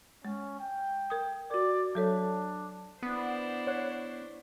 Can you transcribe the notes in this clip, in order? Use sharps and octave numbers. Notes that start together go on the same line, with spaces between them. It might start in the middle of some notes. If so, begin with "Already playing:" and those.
G#3 C#4
G5
A#4 D#6
F#4 A#4 D5
F#3 D4 A4 C#5
B3 D4 E4 C5
C#5 F#5